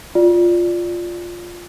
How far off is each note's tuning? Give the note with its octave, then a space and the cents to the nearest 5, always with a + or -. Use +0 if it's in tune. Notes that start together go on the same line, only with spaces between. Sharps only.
F4 +0 D5 +0